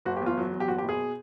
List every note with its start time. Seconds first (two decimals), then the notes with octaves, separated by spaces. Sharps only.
0.05 F#1 F#4
0.17 G4
0.21 E2 F4
0.38 F#3
0.53 E2
0.60 G4
0.68 F#1 F#4
0.78 G4
0.84 B2 G#4